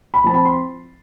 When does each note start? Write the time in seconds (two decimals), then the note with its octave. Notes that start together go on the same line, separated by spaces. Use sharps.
0.14 B5
0.24 F3 C4 A5
0.34 B5
0.45 C6